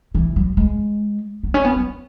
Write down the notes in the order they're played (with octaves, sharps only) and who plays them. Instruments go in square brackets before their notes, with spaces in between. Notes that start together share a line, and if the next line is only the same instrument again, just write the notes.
[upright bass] E3
F#3
G#3
B3
C#4
B3
F#3